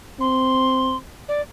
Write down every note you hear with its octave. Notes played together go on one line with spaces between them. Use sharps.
C4 C6
D5